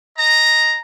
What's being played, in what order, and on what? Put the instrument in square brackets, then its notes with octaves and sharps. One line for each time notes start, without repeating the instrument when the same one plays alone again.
[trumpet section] D#5 A#5